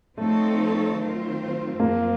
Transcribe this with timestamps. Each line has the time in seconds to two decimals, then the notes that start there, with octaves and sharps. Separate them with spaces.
0.18 F3 A3 C4 D#4 A4 C#5
0.99 D#3 F#3 C4 F4 C5
1.80 F#2 F3 A#3 C4 F4